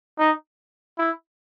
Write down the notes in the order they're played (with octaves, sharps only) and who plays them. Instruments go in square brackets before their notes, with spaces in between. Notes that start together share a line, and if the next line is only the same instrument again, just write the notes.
[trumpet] D#4
E4